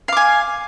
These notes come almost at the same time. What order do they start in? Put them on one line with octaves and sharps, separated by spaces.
F5 D6 G#5